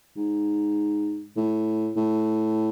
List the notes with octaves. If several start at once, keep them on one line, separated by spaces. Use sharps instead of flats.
G#2
A2
A2